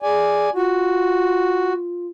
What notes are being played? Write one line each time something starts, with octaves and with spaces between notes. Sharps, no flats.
G#4 D5 G#5
F4 F#4